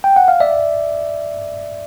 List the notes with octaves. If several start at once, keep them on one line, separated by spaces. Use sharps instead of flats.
G5
F#5
F5
D5 E5